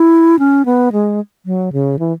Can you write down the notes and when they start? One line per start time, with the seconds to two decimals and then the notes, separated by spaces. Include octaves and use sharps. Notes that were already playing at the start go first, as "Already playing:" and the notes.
Already playing: E4
0.39 C#4
0.66 B3
0.92 G#3
1.46 F#3
1.73 C#3
1.99 E3